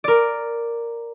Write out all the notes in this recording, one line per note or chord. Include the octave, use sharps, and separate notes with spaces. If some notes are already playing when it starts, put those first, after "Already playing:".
A#4 D5